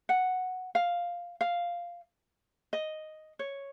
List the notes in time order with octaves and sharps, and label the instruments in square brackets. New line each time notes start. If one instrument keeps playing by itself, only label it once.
[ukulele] F#5
F5
F5
D#5
C#5